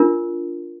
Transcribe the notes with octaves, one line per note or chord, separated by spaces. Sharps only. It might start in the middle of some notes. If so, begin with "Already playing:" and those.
Already playing: D4 F4 A#4